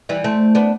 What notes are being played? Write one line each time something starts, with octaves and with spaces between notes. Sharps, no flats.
E3 G3
A3 C4
B3 D4